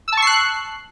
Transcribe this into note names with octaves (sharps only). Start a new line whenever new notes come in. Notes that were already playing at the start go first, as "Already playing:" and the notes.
A5 C#6 E6 F#6 C7